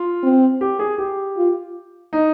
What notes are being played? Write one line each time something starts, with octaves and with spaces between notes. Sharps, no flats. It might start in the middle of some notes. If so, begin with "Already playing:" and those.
Already playing: F4
C4
G4
G#4
G4
F4
D#4